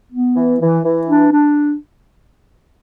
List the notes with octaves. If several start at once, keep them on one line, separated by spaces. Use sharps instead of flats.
B3
E3
E3
E3
D4
D4